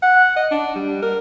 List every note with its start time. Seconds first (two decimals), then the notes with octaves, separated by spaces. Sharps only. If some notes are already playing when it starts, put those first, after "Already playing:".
0.02 F#5
0.36 D#5
0.51 D4
0.75 G3
1.02 A#4